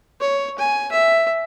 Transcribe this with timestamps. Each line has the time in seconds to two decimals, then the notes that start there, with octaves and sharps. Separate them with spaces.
0.21 C#5
0.58 G#5
0.92 E5